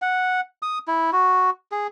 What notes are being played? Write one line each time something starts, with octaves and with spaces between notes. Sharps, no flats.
F#5
D#6
E4
F#4
G#4